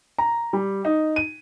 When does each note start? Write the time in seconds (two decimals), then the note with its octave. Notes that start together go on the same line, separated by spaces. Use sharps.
0.19 A#5
0.53 G3
0.85 D#4
1.16 D#7